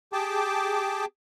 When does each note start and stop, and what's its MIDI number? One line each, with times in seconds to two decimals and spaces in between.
0.13 1.05 67
0.13 1.05 68
0.13 1.05 79
0.13 1.05 81
0.13 1.05 86